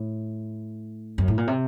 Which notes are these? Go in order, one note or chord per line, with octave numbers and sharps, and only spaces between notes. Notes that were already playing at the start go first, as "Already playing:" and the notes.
Already playing: A2
F#2
A2
A#2
C3